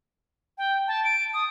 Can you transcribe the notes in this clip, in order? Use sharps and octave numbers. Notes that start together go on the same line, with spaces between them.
G5
A5
D7
D#6